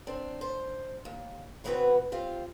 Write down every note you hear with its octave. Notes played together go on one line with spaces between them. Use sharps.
C4 D4
C5
D#2
C3 E3 B3 C4 F#4 B4
C4 F4 G4